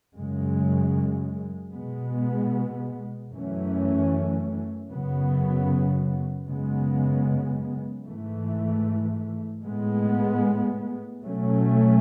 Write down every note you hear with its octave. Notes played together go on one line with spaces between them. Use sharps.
F#2 C#3 G#3
B2 G#3 B3
F#2 E3 A3 C#4
F#2 C#3 F#3 B3
F#2 C#3 G#3 B3
G#2 E3 A3
A2 G#3 B3
B2 F#3 A3 C#4